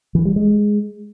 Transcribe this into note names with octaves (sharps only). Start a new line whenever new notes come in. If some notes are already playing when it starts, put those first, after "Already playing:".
E3
G3
G#3